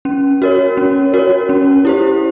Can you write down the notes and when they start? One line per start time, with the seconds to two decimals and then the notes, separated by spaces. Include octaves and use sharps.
0.05 C#4
0.42 F#4 A#4 C#5
0.77 C#4
1.13 F#4 A#4 C#5
1.49 C#4
1.85 E4 G4 C5